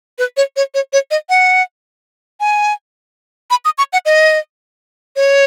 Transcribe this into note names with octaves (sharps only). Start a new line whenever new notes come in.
B4
C#5
C#5
C#5
C#5
D#5
F#5
G#5
B5
D#6
C#6
F#5
D#5
C#5